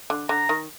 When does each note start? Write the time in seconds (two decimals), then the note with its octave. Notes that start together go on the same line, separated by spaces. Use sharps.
0.10 D3
0.29 D3 A#5
0.49 D#3